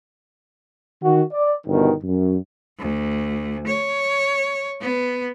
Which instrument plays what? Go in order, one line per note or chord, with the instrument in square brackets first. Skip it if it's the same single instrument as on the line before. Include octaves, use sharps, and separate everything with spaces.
[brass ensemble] D#3 F#4
D5
G1 B2 D#3
F#2
[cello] D2
C#5
B3